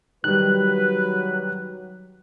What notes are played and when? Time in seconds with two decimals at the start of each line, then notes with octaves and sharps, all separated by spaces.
0.24 D#3 F#3 G3 B4 F#6